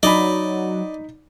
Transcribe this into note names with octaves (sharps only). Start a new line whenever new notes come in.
F#3 D#4 D5 D#5 B5